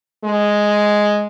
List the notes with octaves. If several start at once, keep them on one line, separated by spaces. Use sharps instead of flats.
G#3